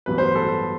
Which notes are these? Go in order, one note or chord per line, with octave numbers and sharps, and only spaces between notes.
A1 G2 F#3 B3 B4
C5
B4
A4